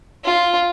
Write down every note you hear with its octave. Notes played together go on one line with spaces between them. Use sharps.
F4